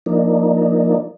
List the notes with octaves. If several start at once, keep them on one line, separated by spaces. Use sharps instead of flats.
F3 A#3 D4 D#4